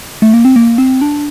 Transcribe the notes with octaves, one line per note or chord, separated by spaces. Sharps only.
A3
A#3
C4
A#3
C4
D4